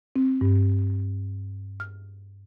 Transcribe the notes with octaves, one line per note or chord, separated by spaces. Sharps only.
C4
G2
F6